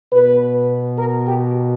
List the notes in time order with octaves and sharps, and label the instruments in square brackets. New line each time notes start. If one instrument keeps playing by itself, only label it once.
[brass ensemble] B2 B4
A#4
G4